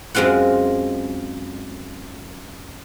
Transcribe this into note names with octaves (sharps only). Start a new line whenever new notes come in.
F#2 G#3 C4 F4 F#5